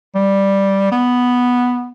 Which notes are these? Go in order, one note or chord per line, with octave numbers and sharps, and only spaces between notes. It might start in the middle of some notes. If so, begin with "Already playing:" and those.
G3
B3